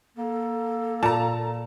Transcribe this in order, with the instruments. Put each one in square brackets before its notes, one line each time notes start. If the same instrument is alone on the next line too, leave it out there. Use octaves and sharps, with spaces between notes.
[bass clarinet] A#3 [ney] A4
[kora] A#2 [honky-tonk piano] A5 A#5